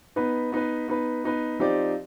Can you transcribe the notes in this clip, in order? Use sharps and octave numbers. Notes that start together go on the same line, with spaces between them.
B3 D#4 B4
B3 D#4 B4
B3 D#4 B4
B3 D#4 B4
F3 C4 D#4 G4 D5